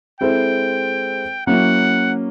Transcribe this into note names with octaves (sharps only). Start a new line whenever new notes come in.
G#3 C4 E4 A4 C5 G5
F#3 A#3 C#4 E4 F#5